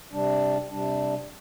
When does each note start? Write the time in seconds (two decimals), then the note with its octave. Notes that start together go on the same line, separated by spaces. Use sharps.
0.12 C3 G3 D4
0.69 C3 G3 D4